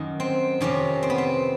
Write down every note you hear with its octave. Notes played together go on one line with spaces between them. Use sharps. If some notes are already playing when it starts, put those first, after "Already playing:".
Already playing: F#2 D#3
C4
F2 C3 D#3 C#4
C4
B3
C4